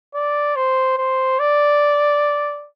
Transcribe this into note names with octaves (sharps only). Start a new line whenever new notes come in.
D5
C5
C5
D5